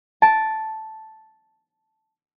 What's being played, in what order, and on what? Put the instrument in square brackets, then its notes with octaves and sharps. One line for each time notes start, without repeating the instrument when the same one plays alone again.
[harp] A5 D7